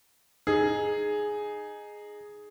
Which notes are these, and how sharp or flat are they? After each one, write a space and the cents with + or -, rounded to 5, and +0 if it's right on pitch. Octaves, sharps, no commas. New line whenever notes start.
D#4 -15 G#4 +5